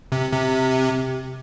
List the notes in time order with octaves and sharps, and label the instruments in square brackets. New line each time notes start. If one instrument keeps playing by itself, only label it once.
[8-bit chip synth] C3
C3